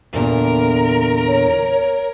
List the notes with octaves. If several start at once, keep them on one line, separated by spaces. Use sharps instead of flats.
E2 A#2 D3 A#4
C#5